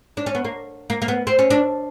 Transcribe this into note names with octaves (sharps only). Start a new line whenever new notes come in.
D4
C#4
B3
A#3
A#3
A#3
B3
C4
C#4
D4